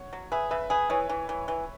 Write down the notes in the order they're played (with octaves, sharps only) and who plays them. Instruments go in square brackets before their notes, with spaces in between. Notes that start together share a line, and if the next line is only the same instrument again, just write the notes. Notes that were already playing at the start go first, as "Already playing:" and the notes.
Already playing: [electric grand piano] C#5 F#5
[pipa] F#3
[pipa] G#4 [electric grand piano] B4 E5
[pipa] C#3 [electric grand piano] B4 E5
[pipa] G#4 [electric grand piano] B4
[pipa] E3 [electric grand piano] C#5
[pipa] E3
E3
E3